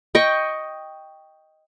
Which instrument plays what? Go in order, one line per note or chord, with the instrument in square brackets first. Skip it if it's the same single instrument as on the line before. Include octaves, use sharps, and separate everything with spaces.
[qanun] D#5 G5 C#6